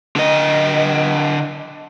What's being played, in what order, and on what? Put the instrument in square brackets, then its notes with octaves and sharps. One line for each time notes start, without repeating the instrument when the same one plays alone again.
[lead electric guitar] D3 D#5